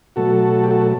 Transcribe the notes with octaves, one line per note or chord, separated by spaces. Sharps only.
B2 F#3 A3 F#4 A4
G4
F#4 A4